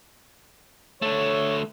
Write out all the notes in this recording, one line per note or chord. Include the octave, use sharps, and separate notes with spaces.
D3 A3 C#5